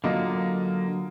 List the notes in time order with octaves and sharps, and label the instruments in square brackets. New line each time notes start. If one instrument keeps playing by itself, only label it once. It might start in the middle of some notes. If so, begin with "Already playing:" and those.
[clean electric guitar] D3 F#3 F4 [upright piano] A#3 D#5